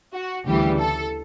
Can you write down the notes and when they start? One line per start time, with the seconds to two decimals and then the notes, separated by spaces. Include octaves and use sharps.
0.14 F#4
0.46 D2 C#3 E3 G3 G4
0.78 A4